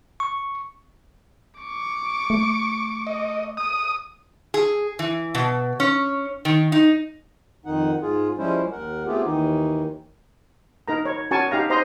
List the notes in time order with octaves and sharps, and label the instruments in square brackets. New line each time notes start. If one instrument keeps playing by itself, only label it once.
[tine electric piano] C#6
[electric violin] C#6 D6
[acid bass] A3
[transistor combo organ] D#5
D#6
[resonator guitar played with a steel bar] G#4
E3
B2
C#4
D#3
D#4
[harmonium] F2 D#3 D#4 F#5
G#2 F4 G#4
F3 G3 G#3 C#4 E4 C5
D#2 A#4 F#5
A3 B3 C4 F4 G4 G#4
D#2 D#3 E3 D#4
[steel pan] D#4 A#4 A#5
C#5
C#4 F#4 A#4 G#5 A5 C#6
D#4 G4 F5 A#5
D#4 C5 D#5 A#5 C6